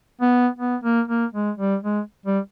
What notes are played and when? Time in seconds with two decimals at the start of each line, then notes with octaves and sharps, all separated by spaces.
0.21 B3
0.59 B3
0.84 A#3
1.08 A#3
1.33 G#3
1.58 G3
1.83 G#3
2.26 G3